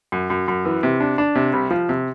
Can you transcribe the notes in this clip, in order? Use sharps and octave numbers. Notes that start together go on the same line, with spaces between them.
F#2
F#2
F#2
E3
C3
D4
D4
C3
C2
F3
C3